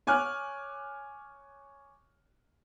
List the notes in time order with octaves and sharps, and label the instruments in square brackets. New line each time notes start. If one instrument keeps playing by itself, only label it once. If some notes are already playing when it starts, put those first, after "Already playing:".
[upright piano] C#5 G#5 D6 F6 F#6